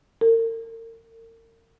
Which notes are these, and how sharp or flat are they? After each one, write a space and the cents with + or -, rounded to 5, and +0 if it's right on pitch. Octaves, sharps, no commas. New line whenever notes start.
A#4 -40